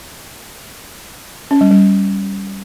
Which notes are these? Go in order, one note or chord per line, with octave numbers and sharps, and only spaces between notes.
C#4
G3
G3